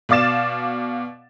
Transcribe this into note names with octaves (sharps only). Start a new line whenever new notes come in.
B2 D5 F5 D6 A6 E7